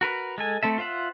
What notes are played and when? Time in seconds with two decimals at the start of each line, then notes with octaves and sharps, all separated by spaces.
0.01 F#4 A#4 B4
0.38 G#3 A4 G#5
0.63 A3 C4 A4 E5
0.78 F4 C5 E5 F#5